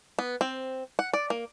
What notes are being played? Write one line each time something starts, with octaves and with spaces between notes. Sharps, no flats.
B3
C4
F#5
D5
A#3